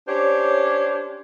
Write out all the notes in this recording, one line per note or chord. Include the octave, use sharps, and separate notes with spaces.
C#4 D4 G4 C5 C#5